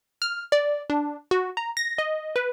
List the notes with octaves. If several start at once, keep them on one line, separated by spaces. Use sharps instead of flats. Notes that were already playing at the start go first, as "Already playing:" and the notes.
F6
D5
D4
F#4
A#5
A#6
D#5
B4